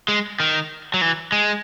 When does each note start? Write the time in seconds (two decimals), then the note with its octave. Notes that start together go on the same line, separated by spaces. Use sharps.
0.08 G#3
0.40 D#3
0.94 F#3
1.01 E3
1.32 G#3